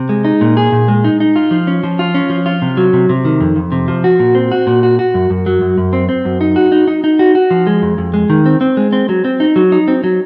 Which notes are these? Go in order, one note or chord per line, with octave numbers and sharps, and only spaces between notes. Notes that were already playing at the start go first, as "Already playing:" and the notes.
Already playing: C3
G#3
D#4
A#2
G#4
A#2
G#3
D#4
D#4
F4
F3
C#4
F3
F4
C#4
F3
F4
C3
F#3
C3
C3
D#3
F2
F2
C3
F3
F#4
A#2
C4
F#4
A#2
F#4
F#4
F#2
F#2
F#3
F#2
F#2
C4
C4
F#2
D#4
F#4
D#4
D#4
D#4
F#4
F#4
F3
G#3
F2
F2
G#3
D#3
C4
C4
G#3
C4
F#3
C4
D#4
F#3
D#4
C4
F#3